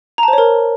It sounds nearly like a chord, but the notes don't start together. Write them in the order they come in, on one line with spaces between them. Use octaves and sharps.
A#5 A5 C5 C#5 A#4